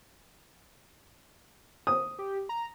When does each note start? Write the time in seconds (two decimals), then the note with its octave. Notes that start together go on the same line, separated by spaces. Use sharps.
1.87 D#6
2.19 G4
2.49 A#5